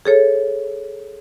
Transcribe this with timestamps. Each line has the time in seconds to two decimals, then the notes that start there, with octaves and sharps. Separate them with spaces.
0.05 G#4 A4 C#5